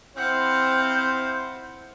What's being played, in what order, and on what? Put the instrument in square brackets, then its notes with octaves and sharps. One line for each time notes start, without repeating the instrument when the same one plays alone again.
[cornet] C4 [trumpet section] E4 C5 [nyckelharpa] F5 F#5 [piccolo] G6